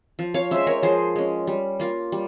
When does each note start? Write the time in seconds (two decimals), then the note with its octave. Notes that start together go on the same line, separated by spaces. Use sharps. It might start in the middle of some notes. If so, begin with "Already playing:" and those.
0.19 F3
0.34 C#5 F5
0.51 G#3 C#4 C5 E5
0.67 A#4 C#5
0.83 F3 G#4 C5
1.16 G#3 C#4
1.47 G3
1.80 A#3 F4
2.12 G3